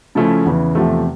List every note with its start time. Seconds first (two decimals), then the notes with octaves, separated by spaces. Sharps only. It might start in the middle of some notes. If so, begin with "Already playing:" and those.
0.15 C#3 F3 A3 C#4 E4
0.45 E2 C#3 E3
0.75 E2 C3 F3 A3